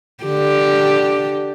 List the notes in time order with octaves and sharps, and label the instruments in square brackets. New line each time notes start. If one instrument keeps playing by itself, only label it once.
[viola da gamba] D3 G4